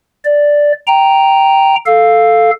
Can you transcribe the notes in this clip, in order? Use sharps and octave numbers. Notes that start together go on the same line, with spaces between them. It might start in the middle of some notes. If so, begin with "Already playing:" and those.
D5
G5 A#5
A4 F5